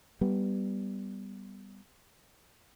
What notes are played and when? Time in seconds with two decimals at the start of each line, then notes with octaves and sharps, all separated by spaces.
0.21 G3 B3